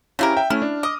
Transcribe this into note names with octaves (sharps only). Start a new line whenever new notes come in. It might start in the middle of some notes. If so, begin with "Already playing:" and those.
C#3 C4 C#4 E4 G4 A#4
E5 G5
A3 C#4 E4 F6
D4
D#5 D6 D#6